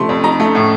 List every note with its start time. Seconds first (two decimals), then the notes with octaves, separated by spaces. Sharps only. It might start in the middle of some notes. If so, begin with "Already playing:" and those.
Already playing: C3 F3 A3 C6
0.09 F2
0.24 D#4 A#5
0.40 A3
0.55 A2